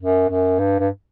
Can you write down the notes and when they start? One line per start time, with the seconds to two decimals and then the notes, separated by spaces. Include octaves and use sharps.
0.01 F#2
0.29 F#2
0.59 G2
0.79 G2